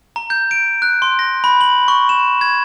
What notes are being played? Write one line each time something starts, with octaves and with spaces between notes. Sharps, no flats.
A#5
G6
D7
F#6
C6
A#6
B5
F#7
C#6
E7
G#6